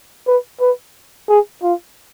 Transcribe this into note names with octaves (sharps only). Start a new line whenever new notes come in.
B4
B4
G#4
F4